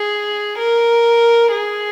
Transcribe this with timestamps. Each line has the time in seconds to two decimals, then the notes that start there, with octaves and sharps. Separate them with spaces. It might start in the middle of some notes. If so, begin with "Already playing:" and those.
Already playing: G#4
0.58 A#4
1.51 G#4